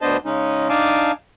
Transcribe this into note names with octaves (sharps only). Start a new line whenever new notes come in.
D2 B3 D4 C5 D#5 A5
C#3 G#3 C#4 D#4
D4 D#4 F5 G#5 A5 D6